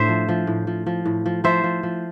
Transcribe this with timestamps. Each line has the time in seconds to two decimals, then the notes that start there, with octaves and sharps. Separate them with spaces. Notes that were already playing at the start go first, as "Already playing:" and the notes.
Already playing: A2 D4 C5 E5
0.09 F3
0.29 F3
0.47 A2
0.67 F3
0.86 F3
1.05 A2
1.26 F3
1.44 F3 C5 E5
1.64 F3
1.83 F3